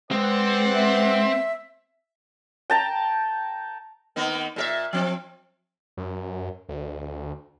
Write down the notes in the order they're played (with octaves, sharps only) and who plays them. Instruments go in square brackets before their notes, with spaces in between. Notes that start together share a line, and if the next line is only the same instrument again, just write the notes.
[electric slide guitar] G#3 [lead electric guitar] C4 [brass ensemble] B4 D5 F#5
[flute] E5
[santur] G5 A5 A#5
[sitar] D#3 A#3 B3
A#2 G4 E5
F3 C4
[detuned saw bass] F#2
D2